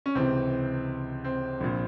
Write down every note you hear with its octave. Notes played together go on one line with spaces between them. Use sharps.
C#4
C#2 C3 E3 C4
C4
A#1 A#2